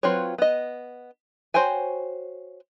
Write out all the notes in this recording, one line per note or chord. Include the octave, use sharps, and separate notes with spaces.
F#3 C4 F4 B4 C#5
B3 D#5
F#4 C5 C#5 G5 G#5